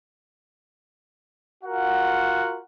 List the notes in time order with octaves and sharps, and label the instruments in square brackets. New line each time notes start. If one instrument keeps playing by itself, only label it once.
[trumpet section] F4 F#4 A#4 F#5